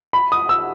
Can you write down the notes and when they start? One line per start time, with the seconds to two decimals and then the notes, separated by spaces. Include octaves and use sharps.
0.13 B5
0.32 D#6
0.49 E6